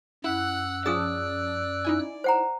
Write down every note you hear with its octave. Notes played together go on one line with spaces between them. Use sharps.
F#2 E4 F#5 E6 F#6
F3 C#4 G#4 D5 A5 D#6
D#4 E4 G#5
C5 F#5 A#5